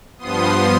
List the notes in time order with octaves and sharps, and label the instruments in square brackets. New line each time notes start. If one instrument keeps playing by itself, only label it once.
[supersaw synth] G2 F3 B3 C6 D#6